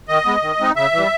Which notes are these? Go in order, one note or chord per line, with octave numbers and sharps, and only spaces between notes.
D#3 D#5
G#3 B3
D#3
G#3 C4 D#4
C#3 E5
E3 G3